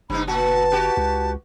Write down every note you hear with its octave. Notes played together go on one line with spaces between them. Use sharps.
F#1 G2 D#4 B5
A#2 F#4 A5
F#4 G4 B4
C#2